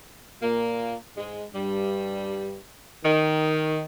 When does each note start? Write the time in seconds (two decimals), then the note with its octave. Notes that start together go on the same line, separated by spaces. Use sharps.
0.42 A#2 A#3
1.16 G#2 G#3
1.54 G2 G3
3.04 D#3